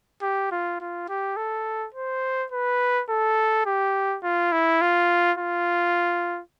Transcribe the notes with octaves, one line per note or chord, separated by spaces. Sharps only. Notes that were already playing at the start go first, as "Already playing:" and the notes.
G4
F4
F4
G4
A4
C5
B4
A4
G4
F4
E4
F4
F4